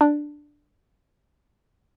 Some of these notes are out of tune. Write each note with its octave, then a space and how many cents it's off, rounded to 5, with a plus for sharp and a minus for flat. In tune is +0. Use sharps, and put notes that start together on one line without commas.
D4 +5